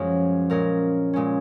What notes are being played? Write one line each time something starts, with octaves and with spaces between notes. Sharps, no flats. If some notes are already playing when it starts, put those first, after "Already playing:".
Already playing: F#2 F3 G#3 C#4 G#4
A#2 G#3 C#4 A#4
A#2 G#3 C#4